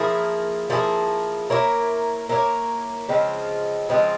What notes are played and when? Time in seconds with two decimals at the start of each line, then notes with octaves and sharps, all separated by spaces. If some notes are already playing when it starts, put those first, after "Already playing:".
Already playing: F3 A#3 E4 G#4
0.70 F3 A#3 E4 G#4
1.50 A#3 E4 A#4 C#5
2.29 A#3 E4 A#4 C#5
3.09 C#3 F3 G#3 C4
3.89 C#3 F3 G#3 C4